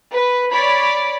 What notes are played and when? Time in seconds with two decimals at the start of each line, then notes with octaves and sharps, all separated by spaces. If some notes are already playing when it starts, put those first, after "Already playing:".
0.14 B4
0.51 C#5 D5 B5